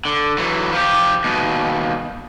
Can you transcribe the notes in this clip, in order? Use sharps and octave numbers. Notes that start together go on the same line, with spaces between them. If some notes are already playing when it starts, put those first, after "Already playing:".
D3
E3 F#3
F3 G4
D#2 B2